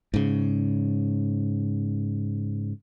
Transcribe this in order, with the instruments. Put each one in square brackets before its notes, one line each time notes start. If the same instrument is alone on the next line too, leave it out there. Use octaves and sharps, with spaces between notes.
[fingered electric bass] G#2 C#3